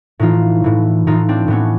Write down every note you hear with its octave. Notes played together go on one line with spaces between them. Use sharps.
A2 E3 D#4 F4
A2 E3
A2 E3 D#4 F4
C4 D4
A2 E3 B3 C#4